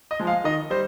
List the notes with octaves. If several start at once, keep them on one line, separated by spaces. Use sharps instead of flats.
D#5
F3 G#3
F5
D#3 D#5
G3 C5